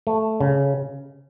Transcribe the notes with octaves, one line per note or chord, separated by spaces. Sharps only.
A3
C#3